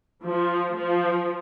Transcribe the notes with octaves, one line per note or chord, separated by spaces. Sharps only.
F3
F3